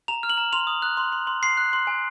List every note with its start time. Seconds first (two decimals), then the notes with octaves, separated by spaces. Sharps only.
0.08 A#5 F7
0.23 F6
0.30 F#7
0.37 A#5
0.53 C6 F7
0.67 D#6
0.82 F#6
0.97 C6
1.12 C6
1.27 C6
1.43 C6 C7
1.57 F#6
1.73 C6
1.87 G#5